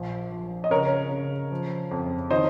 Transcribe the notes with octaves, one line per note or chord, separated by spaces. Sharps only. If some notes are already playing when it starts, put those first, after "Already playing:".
Already playing: A#1 F3
F3
D#5
C#3 A#4 C#5
C#3
F3
F2
D#3 C5 D#5